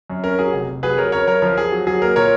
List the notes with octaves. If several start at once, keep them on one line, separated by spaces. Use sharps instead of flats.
F#2
C#4 A#4
F#3 G#4
F1
F1
F#3 G#4 B4
F#3 A#4 C#5
C#3 A#4 C#5
F#2 A#4 C#5
F3 A#4
F3 G#4
F#3
F#3 G#4
A#3 A#4
A#2 A#4 C#5